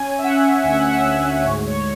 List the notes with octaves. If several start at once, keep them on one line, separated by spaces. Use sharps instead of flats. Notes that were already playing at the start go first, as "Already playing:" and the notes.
Already playing: C#4 G#5
E5
C#4 F#5
D2 E5
F#5
E5
F#5
E5
D2 E5
G#2 C#5
C#5